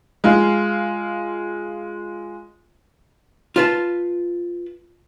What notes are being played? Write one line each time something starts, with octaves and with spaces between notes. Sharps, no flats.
G#3 F4
F4 B4 A5